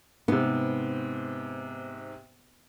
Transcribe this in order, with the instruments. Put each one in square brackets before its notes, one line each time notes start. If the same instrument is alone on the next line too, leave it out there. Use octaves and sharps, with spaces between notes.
[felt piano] G#2 C3 [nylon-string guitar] B3